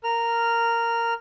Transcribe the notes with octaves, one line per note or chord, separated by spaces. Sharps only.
A#4 F6